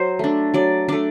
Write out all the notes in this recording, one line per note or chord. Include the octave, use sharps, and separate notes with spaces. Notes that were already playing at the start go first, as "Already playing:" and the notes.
Already playing: F#3 C5
A3 D4
F#3 D5
A3 D4 D5